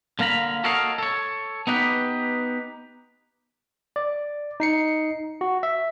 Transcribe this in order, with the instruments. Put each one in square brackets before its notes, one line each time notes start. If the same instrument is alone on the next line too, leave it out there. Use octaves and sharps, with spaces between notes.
[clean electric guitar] D3 A#3 F5 A#5 B5
F#4 A4 A#4 C#5 D#5 F5
A4 C#5
B3 D#4 G4 B4
[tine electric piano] D5
D#4 C7 C#7
F#4
E5